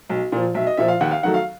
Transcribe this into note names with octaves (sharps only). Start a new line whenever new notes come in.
B1
A#2 F3
B1 E5
D#5
A#2 F3 E5
F5
D#2 F#5
F5
D#3 F#3 A3 F#5
F5